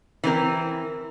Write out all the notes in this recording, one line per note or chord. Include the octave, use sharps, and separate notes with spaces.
E3 C4 A#4